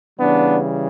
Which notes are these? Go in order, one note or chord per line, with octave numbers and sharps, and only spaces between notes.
C#3 E3 G3 B3 D4